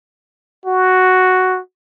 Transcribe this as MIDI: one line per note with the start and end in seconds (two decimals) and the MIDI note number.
0.66 1.59 66